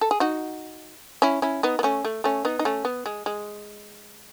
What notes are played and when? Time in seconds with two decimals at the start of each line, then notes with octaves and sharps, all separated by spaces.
0.01 A4
0.11 G#4
0.20 D#4 F#4
1.22 C#4 E4
1.42 C#4 E4
1.63 B3 D#4
1.79 B3
1.83 A3 C#4
2.04 A3
2.24 A3 C#4
2.45 B3 D#4
2.59 D#4
2.65 A3 C#4
2.85 B3
3.06 G#3
3.26 G#3